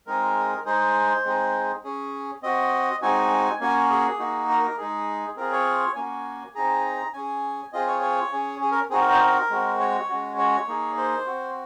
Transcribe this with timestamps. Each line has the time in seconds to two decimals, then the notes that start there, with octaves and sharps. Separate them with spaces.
0.07 G#3 C4 D#4 G#4 A#4
0.66 G#3 D#4 G#4 C5
1.25 G#3 C4 D#4 G#4
1.84 C#4 G#4
2.43 C4 F#4 D#5
3.02 G#3 C4 D#4 F#4 G#5
3.60 A#3 C#4 F#4 G#5
3.90 G#4
4.19 A#3 D#4 F#4
4.49 A#4
4.63 A#4
4.78 G#3 D#4 G#4
5.37 C4 F4 G#4 A#4
5.52 C#5
5.96 A#3 C#4 F#4 G#5
6.54 C4 D#4 G#4 A#5
7.13 C#4 G#4 G#5
7.73 C4 F4 G#4 D#5
7.87 C#5
8.02 C#5
8.32 C#4 G#4
8.61 G#4
8.72 A#4
8.90 C4 D#4 F#4 G#4
9.01 A#4
9.11 C5
9.20 A#4
9.50 G#3 C4 F#4
9.80 C#5
10.09 G#3 C#4 F#4
10.38 C#5
10.68 A#3 D#4 G#4
10.97 C5
11.26 C4 F#4